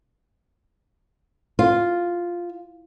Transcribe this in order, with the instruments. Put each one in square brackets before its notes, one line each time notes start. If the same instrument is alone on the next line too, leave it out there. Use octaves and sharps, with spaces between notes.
[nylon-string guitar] F4